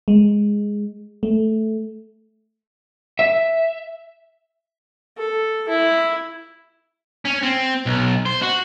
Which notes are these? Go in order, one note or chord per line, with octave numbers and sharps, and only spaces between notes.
G#3
A3
E5
A4
E4
C#4
C4
B1
C5
F#4